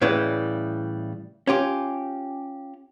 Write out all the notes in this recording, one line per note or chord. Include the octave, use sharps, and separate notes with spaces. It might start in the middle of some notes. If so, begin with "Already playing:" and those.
A2 C#3 E3 G3
C#4 F4 G4